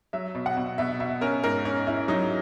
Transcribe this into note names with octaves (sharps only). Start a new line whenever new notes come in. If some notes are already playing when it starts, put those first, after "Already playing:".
F#3 E5
B2
F#5
B2
B2 E5
B2 E5
C#4 A#4
G#2 A#4
C#4
C#4 E4
F#3 D#4